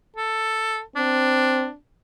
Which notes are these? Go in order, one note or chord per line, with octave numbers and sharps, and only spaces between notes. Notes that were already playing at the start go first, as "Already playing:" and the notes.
A4
C4 D4